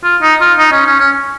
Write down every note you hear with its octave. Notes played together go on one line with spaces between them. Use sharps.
F4
D#4
F4
D#4
C#4
C#4
C#4